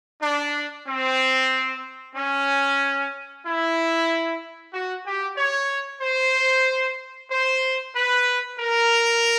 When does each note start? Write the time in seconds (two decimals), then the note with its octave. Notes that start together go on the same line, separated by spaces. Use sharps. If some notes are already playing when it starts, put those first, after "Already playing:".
0.22 D4
0.87 C4
2.16 C#4
3.45 E4
4.73 F#4
5.06 G4
5.37 C#5
6.02 C5
7.31 C5
7.95 B4
8.59 A#4